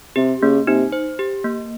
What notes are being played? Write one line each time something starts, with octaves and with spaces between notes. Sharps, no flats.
C3 G4
C#3 A#3
C3 D#4
C5
G4
A#3